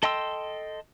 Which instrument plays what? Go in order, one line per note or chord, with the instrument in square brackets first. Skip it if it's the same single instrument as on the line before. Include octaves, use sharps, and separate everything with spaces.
[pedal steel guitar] A4 D#5 G5 C6 E6